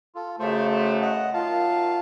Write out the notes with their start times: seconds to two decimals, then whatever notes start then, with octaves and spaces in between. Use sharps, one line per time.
0.15 F4 A4
0.39 F#2 C#3 A3 A4 C5
0.71 A4 C5
1.02 D#5 F#5
1.34 F#2 D#3 A#3 F4 F5 A5